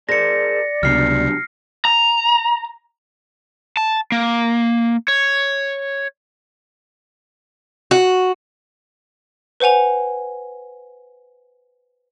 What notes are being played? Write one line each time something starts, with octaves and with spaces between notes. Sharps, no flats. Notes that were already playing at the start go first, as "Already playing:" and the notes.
G#4 A#4 C5 D5 A#6 C#7
C#2 C3 F#3 G3 B3 D4 F6 C7
A#5
A5
A#3
C#5
F#4
B4 C5 F#5 G#5 F7